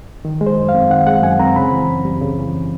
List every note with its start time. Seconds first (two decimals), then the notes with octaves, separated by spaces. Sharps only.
0.25 D#3
0.41 G#3
0.47 C5
0.57 F#2
0.69 F5
0.74 C4
0.90 D#3 F#5
1.07 G#3 F#5
1.23 F#2 G#5
1.39 C4 A#5
1.56 C#3 B5
1.73 E3
1.88 F#2
2.05 G3
2.21 C#3
2.38 E3